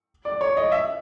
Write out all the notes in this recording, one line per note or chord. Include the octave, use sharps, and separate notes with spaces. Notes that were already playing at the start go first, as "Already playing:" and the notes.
D5
C#5
D#5
E5